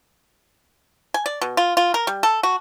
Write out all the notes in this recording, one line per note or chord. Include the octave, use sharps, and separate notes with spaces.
G#5
D5
B2
F4
F4
A#4
G3
A4
F#4